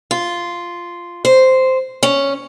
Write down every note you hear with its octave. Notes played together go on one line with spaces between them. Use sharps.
F4
C5
C#4